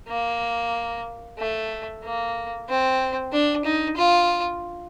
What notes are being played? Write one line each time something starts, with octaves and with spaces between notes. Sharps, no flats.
A#3
A3
A#3
C4
D4
D#4
F4